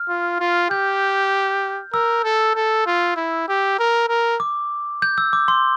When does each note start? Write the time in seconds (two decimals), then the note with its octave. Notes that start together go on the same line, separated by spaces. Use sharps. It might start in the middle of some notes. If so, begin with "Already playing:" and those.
Already playing: F6
0.09 F4
0.40 F4
0.70 G4 G6
1.93 A#4 E6
2.24 A4
2.55 A4
2.86 F4
3.16 E4
3.48 G4
3.79 A#4
4.09 A#4
4.40 D6
5.02 G6
5.18 E6
5.33 D6
5.48 C6